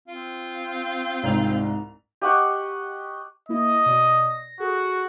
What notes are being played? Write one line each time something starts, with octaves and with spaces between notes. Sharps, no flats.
C4 F4
C2 G#2 F7
G4 D#5 F#5 C#6
A#3 E4 D#5
B2 D5
A#6
F#4 G#4 A4